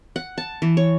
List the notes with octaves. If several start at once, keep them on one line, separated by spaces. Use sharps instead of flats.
F#5
A5
E3
C#5